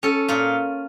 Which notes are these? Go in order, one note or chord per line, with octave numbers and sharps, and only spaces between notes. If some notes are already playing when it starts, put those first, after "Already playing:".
C#4 A4
A#2 F4